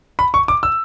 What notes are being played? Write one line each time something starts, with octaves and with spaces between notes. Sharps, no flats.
B5
C#6
D6
E6